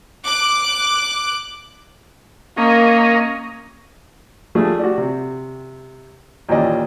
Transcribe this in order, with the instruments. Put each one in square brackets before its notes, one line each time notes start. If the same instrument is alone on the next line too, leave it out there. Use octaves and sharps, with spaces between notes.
[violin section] D6 F#6
[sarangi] A#3 [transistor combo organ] C#4 A#4 D#5
[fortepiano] F3 G3 A3 D4 G#4
F#4 G4 D5
C3
D#2 A#2 E3 C#4 D5 D#5